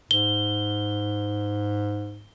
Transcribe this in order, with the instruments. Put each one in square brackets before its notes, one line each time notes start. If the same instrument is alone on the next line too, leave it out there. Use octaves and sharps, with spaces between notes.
[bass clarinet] G#2 [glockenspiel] G7